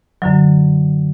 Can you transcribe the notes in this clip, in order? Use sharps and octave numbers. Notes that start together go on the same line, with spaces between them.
F#2 D3 F#3